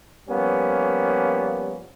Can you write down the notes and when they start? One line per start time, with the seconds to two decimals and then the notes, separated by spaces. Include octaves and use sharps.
0.29 F3 G3 A#3 B3 C#4